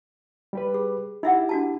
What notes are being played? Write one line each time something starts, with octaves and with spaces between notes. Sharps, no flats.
G3 G4 B4
G#4
D#4 E4 G4 E5 F#5
D4 F#4 A5